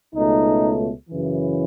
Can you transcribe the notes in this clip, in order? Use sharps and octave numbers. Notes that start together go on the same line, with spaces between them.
C#2 B2 A3 D#4
F#2 C#3 E3